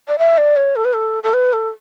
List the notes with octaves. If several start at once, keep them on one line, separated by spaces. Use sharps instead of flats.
D5
E5
D5
C#5
A4
B4
A4
A4
B4
A4